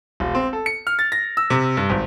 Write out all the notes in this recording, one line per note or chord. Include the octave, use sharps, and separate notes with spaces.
E1
C4
A4
C#7
F6
A6
A#6
E6
C3
G2
G#1